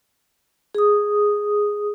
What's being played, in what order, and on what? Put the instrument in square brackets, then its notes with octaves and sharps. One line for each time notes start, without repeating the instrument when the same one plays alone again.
[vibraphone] G#4 D#6